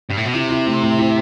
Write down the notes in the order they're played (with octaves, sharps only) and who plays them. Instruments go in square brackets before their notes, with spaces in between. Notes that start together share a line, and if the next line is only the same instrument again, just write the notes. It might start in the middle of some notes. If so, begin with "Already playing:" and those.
[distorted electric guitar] G2
A2
B2
[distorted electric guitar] C3 [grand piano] E4
[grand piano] E4
A3
A2
E4